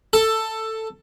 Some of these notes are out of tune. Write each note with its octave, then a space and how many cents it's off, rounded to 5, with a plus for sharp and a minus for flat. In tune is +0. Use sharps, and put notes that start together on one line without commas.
A4 +10